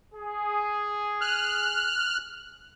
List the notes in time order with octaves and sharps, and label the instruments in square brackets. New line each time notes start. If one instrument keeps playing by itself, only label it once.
[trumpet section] G#4
[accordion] F6 F#6